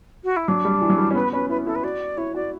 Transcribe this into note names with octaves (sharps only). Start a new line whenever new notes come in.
F#4
E4
F#3 D4
G3
E3
F#3
G3
C#4
B3 B4
C#4 B4
E4 B4
E4 A4
B4
F#4 D5
E4 C#5
F#4 D5